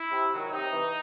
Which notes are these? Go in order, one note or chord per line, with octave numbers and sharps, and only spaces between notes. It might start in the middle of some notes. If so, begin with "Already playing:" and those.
Already playing: E4
C3
D#3 F#3
C3 D#4
E3